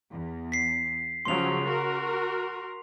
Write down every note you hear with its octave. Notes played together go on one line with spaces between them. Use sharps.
E2
B6 C7
C#3 F3 F#3 C6 F7
F#4 A#4